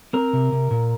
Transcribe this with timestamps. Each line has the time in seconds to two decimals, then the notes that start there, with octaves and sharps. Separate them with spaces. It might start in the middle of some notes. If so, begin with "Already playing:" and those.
0.13 C4 A#4
0.33 C3
0.52 C3
0.71 A#2